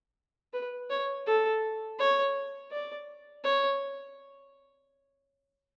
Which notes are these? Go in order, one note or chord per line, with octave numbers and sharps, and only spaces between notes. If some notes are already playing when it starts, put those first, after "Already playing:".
B4
C#5
A4
C#5
D5
C#5